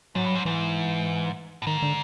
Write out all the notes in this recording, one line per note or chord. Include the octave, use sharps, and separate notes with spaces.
G#2 F#3
G2
G#2
G#2 E3
A2
G#2 D#3
D3